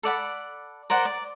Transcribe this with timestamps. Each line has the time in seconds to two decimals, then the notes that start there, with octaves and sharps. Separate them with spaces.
0.03 A4 D5 F#5 B5
0.90 A#4 C5 D5 F#5
1.05 D5